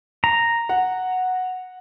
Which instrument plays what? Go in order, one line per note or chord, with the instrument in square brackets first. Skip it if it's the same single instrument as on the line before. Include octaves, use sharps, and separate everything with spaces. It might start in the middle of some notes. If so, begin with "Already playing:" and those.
[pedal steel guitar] A#5
[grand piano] F#5